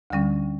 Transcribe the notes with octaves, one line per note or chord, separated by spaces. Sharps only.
D2 D3 G3 C#4